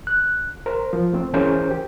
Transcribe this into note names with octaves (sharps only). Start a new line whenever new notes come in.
F#6
A#4 C5
F3
A3 C4
E3 C#4 G#4 A#4 C5 G6
G4